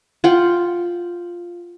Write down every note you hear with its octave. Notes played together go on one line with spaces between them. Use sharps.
F4 F#5 G5